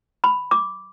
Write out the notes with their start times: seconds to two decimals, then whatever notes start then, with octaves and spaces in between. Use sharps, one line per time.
0.24 B5
0.51 D6